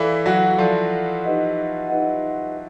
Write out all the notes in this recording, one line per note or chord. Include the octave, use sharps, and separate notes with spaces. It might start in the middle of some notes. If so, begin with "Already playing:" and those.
Already playing: E3 E4 A4 D5 F5
F#3 F#4
F3 F4 A4 D5 F5
D#4 G4 B4 D#5 F#5
D#4 G4 B4 D#5 F#5